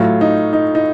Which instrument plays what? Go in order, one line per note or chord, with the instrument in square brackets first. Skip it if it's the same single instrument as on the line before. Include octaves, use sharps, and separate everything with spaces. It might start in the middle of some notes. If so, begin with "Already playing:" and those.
Already playing: [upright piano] A2 F#3 A3 F4
D#4
D#4
D#4